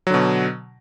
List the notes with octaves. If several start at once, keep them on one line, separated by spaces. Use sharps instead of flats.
B2 D3 F#3